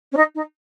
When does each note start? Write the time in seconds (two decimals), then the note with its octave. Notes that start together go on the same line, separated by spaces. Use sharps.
0.12 C#4
0.17 D#4
0.35 D#4